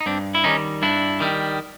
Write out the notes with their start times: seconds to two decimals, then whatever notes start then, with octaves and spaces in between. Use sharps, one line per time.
0.01 D#4
0.06 G2 C4 D4
0.35 E4
0.44 D#3 G3 C#4 D#4
0.82 G2 D4 E4
1.20 D#3 G3